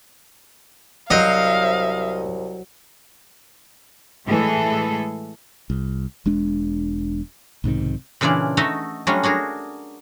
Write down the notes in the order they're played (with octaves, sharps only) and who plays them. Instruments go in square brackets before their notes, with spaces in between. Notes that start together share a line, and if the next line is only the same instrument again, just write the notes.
[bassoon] C2 [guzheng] F#3 C5 [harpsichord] D#5 [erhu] F5
[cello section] A2 E3 G#3 G#4 A4
[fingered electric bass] C2
E1 G#3 D4
B1 G#2 C3 D#3
[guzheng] A#2 C#3 E3 D4 F4 D5
A3 D#4 F#4 A4 D#5 E5
F#3 G3 A3 C#4 D4 F4
D4 F#4 G#4 A#4